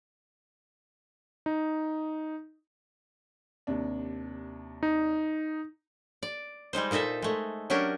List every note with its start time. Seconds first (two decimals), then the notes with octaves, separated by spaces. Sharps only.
1.46 D#4
3.67 D#2 C3 D4
4.83 D#4
6.23 D5
6.73 G3 G#3 D#4 C5
6.91 A#2 D#4 A4 D#5 E5
7.22 G#3 A3
7.70 F#3 C#4 D4 G4 A#4